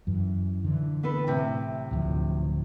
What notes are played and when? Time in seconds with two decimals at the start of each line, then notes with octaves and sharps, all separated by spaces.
0.07 F#2 E3
0.64 D3 E3
1.03 B3 A4 B4
1.27 A2 C3
1.91 D1 D2 F3